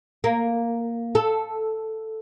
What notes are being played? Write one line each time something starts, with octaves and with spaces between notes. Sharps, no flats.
A#3
A4